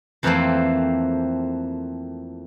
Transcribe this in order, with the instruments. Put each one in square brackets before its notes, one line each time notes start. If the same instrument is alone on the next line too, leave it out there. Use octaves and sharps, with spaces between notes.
[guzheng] F2 E3 F3 A3 A#3 C4